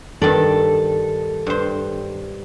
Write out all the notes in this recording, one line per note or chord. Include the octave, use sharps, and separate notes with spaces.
G2 D#3 A4 D5
G2 C5